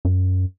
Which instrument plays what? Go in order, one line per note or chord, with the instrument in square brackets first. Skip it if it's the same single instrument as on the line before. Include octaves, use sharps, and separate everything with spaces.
[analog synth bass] F#2